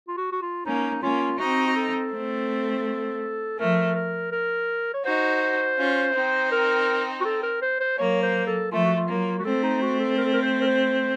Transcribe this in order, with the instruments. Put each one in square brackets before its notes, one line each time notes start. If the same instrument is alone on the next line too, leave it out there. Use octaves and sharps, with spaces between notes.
[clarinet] F4
F#4
F#4
F4
[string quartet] A#3 C#4 [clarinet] D#4
[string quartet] A#3 C#4 [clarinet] F4
[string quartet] C4 D#4 [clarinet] F#4
[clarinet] F#4
A4
[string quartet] A3 C4
[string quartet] F3 A3 [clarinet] A#4
[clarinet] A#4
A#4
C#5
[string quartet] D#4 F#4 [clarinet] C5
[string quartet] C#4 F4
C4 D#4
[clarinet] A#4
F#4
A4
A#4
C5
C5
[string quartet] F#3 A#3 [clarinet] C#5
[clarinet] C5
A4
[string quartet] F3 A3 [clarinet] F4
[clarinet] F#4
F4
[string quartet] F#3 A#3
[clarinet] F#4
[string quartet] A3 C4 [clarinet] A4
[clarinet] D#4
F#4
A4
A#4
A4
A#4
C5
A#4
C5